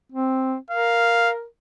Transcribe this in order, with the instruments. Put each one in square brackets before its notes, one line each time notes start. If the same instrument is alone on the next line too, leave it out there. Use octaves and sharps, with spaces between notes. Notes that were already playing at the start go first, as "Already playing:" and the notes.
[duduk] C4
[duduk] A#4 [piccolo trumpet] F5